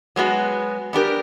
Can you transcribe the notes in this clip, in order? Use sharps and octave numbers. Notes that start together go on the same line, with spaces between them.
F#3 G#3 B3 F#4
B3 D4 G4 A#4